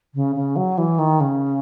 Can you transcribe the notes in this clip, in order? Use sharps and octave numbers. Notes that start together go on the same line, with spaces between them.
C#3
C#3
F#3
E3
D#3
C#3